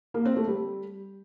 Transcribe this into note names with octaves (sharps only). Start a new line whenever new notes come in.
A#3
C4
A3
G3